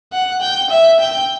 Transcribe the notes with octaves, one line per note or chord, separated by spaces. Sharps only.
F#5
G5
E5
G5